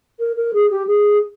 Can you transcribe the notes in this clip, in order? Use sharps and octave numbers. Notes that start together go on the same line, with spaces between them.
A#4
A#4
G#4
G4
G#4